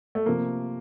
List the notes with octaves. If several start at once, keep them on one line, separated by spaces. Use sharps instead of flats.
A3
C3 F3 A#3